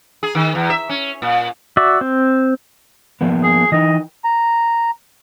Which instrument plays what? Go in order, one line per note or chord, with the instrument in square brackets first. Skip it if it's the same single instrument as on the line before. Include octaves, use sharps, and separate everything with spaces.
[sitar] G#4
D#3
E2
E5
C#4
A#2
[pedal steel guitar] F#4 D5 E5
C4
[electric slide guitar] F3 A#3 B3
[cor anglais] G#4
[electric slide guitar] E3 D#4 [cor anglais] D#5
[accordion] A#5